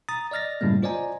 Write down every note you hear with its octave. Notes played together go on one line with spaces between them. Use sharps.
A#5 D#6 A6
D5 D#5 F6 A6 A#6
F#2 A2 C#3 G3 A#3
F4 C5 D5 D#5 G#5 A#5